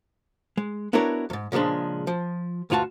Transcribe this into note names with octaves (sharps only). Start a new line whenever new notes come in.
G#3
B3 D4 E4 F#4 A#4 C#5
E2 G#2
A#2 C#3 F3 G#3 D4
F3
D2 G2 F4 F#4 A5